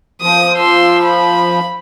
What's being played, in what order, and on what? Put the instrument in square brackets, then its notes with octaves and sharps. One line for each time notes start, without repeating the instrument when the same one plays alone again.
[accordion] F3 [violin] D#6
[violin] C6 E6
B5